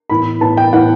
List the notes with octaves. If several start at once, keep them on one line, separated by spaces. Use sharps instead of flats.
A2 E3 B3 B5
A2 E3 B3 A5
G5
A2 E3 B3 F#5